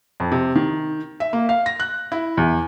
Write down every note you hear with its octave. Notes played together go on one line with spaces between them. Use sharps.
F2
C3
D#3
E5
A#3
F5
A#6
F#6
E4
E2